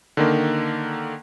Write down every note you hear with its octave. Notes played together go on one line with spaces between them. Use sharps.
D3 D#3 A#3